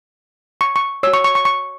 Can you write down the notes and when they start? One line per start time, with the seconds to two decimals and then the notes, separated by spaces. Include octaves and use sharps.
0.61 C#6
0.76 C#6
1.03 F#4 C#5 E6
1.14 C#6
1.24 C#6
1.35 C#6
1.45 C#6